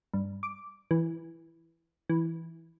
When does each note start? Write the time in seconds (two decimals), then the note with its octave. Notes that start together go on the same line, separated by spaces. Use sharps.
0.14 G2
0.43 D6
0.91 E3
2.09 E3